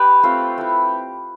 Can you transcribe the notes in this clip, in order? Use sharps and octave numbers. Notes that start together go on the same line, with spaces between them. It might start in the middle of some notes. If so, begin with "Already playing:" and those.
Already playing: G4 B4
A3 C4 F4
A3 E4